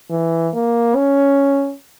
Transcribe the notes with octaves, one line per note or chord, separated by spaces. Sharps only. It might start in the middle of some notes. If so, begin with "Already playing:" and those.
E3
A#3
C#4